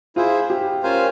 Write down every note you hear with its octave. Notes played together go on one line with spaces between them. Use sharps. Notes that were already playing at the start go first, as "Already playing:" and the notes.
E4 F4 G#4 C5 E5
G4
C#4 F4 A#4 C5 F5 G#5